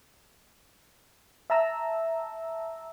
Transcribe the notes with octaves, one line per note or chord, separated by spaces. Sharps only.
E5 A5 A#5 E6